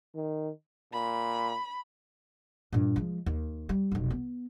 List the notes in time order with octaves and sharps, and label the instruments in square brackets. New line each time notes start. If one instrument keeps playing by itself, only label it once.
[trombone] D#3
[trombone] A#2 [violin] B5
[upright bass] G2 A#2
F3 G#3
D#2
G3
F1 B1
B3